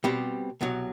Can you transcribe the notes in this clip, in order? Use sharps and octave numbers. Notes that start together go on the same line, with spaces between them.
B2 G3 C4 G4
C2 B2 F#3